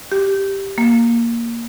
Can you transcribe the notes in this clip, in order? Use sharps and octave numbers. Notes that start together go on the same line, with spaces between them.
G4
A#3